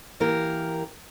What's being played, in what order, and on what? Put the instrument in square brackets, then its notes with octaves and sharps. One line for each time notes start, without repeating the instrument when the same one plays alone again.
[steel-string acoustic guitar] E3 A#3 G4 A#4